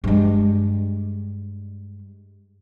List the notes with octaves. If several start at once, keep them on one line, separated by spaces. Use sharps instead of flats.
G2 G#3